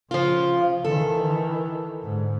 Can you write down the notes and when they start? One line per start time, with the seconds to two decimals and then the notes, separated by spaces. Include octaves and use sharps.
0.11 C#3 F3 F4
0.85 D#3 E3 A4
2.03 G#2 D3